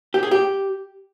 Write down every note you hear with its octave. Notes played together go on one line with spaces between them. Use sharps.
G4
G#4
G4